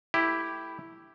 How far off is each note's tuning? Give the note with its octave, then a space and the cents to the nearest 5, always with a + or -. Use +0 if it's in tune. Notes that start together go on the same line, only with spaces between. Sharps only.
A3 +0 E4 +0 G4 +0